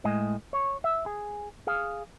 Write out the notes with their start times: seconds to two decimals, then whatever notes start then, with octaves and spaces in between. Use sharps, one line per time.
0.04 A2 G#3 D#5 G#5
0.53 C#5
0.84 E5
1.06 G#4
1.67 G#4 F5